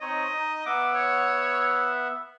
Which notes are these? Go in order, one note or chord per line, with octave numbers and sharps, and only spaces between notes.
C4 D#4 C#5 D#5
D#4
B3 E5 F#5 D6
C#5